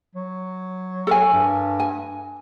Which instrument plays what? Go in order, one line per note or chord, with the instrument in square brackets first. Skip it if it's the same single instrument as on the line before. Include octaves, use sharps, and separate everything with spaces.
[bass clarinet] F#3
[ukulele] A4 A#4 G#5
[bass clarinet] G2
[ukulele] G#5